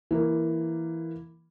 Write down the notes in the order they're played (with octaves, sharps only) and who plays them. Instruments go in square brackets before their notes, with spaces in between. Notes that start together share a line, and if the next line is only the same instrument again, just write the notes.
[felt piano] E3 A#3